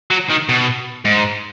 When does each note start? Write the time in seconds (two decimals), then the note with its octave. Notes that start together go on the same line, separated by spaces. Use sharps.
0.11 F#3
0.30 D#3
0.49 B2
1.05 G#2